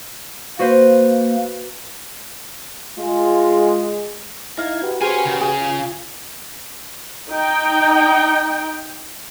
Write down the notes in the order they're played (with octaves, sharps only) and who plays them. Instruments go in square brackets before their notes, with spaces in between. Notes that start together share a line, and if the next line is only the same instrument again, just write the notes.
[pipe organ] A#3 [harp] F#4 B4 C5
[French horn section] G#3 [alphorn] F4
[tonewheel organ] D#4 E4 G#6 [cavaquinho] F5 A#5
[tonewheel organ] F#4 G4 B4
[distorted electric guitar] C#4 G#5 [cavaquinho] G#4 A#4 C5
[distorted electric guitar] C#3
[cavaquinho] G#4
[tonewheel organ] F4
[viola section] D#4 G5